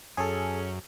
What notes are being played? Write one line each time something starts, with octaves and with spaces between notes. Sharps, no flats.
F#2 C#4 G#4 A4